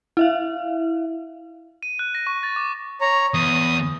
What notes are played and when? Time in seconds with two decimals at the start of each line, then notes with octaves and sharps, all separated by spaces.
0.17 E4 E5 F5
1.83 D#7
1.99 F#6
2.15 A#6
2.27 C#6
2.43 A6
2.56 D6
3.01 C#5 A#5
3.34 E2 D#6